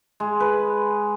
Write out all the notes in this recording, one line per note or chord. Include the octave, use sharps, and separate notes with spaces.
G#3
B4